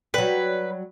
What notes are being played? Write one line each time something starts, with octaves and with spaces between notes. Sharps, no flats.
F#3 G3 B4